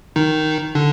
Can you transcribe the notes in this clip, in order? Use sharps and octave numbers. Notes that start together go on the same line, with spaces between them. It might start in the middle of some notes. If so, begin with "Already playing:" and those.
D#3 D#4
D3 D4